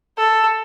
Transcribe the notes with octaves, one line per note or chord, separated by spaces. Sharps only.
A4